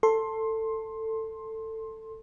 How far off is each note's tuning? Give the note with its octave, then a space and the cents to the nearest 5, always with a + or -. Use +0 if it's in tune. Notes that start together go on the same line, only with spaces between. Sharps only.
A4 +15 C6 +15